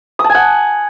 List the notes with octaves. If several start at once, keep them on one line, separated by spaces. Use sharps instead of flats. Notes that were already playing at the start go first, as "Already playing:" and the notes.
D#6
A5
G#5
F#5